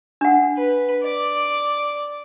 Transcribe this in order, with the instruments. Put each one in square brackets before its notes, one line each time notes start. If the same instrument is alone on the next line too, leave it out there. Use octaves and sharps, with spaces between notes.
[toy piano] D4 F#5
[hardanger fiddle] B4
D5